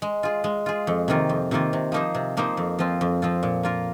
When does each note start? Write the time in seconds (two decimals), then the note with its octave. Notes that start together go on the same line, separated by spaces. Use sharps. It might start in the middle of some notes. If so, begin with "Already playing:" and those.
0.02 G#3
0.23 F4 G#4
0.44 G#3
0.66 F4 G#4
0.87 F2
1.08 C3 D#3 A#3 F4
1.29 F2
1.51 C3 D#3 A#3 F4
1.73 C3
1.92 F3 A#3 D#4 C5
2.14 C3
2.37 F3 A#3 D#4 C5
2.57 F2
2.79 F3 C4 F4
3.01 F2
3.22 F3 C4 F4
3.43 A#2
3.63 A#3 F4 A#4